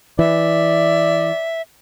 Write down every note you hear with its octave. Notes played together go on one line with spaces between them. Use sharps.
E3 D5 E5